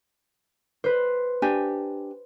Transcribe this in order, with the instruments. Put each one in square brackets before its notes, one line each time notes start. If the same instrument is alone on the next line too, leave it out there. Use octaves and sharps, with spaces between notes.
[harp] B4 C5
[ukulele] D4 G4 G#5